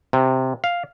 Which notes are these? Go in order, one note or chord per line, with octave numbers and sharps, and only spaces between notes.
C3
F5